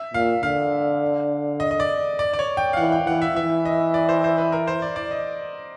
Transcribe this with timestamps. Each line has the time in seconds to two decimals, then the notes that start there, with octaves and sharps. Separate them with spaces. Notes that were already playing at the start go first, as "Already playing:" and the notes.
Already playing: E5
0.14 A#2 F5
0.43 D3 F5
1.60 D#5
1.71 D#5
1.80 D5
2.19 D5
2.34 D5
2.39 C#5
2.57 G5
2.73 F5
2.77 E3 F#5
2.92 G5
3.07 E3 F#5
3.22 E5
3.35 E3 E5
3.65 D#5
3.94 D5
4.09 C5
4.24 C5
4.38 B4
4.52 A#4
4.67 C5
4.82 D5
4.96 D5
5.11 D#5